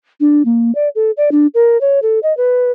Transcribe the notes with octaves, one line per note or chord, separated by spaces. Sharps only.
D4
A#3
D5
A4
D5
D4
A#4
C#5
A4
D#5
B4